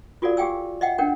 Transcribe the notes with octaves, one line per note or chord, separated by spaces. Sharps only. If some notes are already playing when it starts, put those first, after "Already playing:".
F4 F#4 A4 A#4 D5 F5
G4 G#4 F5 G5 G#5 E6
D#5 E5 F#5 G5
C#4 D4 A#4 F#5 G5